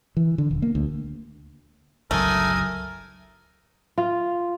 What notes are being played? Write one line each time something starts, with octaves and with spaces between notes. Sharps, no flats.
E3
D3
D#1
A#3
D2
G1 C#2 F#3 A3 A#4 G#5 D#6
F4